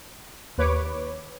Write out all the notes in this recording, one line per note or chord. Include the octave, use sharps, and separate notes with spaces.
D#2 B4 C#5 D6